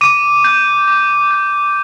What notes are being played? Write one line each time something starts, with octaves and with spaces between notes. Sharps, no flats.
D6 D#7
G6
D6
G6